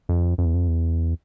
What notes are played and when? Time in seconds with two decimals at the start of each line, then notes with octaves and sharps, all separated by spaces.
0.09 F2
0.38 F2
0.46 E2
0.54 F2
0.68 E2